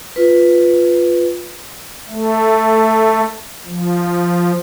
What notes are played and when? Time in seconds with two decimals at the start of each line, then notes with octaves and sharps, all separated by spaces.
0.16 F4 B4
2.09 A3
3.67 F3